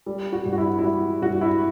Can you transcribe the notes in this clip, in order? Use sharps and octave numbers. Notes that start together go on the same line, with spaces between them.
G3
F#4
G2
F#4
E4
E4
G3 F#4
G2 F#4
E4